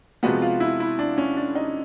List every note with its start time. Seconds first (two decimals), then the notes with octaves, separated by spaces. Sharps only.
0.23 C3 F3 G#3 B3 F#4
0.42 F4
0.60 E4
0.80 E4
0.99 D4
1.18 C#4
1.37 D4
1.55 D#4